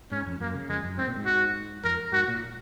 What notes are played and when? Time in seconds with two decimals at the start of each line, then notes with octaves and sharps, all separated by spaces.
0.11 G#2 C#4
0.26 F2
0.40 F#2 A#3
0.54 C#3
0.69 F2 G#3
0.84 F#2
0.98 G#2 C4
1.07 A#2
1.16 G#2
1.26 F#4
1.84 F2 A#4
2.12 G#2 F#4
2.28 A#2